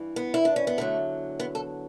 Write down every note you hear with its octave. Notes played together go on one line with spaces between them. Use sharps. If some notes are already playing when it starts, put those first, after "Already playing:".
Already playing: G2 E3
B3
E4
D4
C#4
B3
E2 D3 F#3 A3
B3
A4